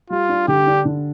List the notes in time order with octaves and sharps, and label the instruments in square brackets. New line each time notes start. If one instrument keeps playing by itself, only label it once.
[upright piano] G3 [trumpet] F4
[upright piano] D4
[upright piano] D3 [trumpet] G4
[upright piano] D4
D3